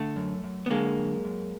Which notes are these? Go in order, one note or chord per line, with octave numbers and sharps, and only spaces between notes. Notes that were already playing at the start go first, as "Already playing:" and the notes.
Already playing: D3 A3
F#2
F#2
B3
D3 G#3 A#3
F#2
F#2